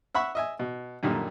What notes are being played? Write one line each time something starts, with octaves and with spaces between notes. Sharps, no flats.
E5 F#5 B5 C#6 E6
D#5 E5 G#5
B2
F#2 A#2 D3 D#3 G3